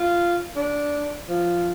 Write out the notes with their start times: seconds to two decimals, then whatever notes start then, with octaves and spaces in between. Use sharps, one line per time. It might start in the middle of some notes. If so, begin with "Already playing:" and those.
Already playing: F4
0.56 D4
1.29 F3